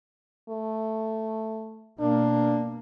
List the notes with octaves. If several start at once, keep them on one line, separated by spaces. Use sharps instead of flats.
A3
B2 A#3 D4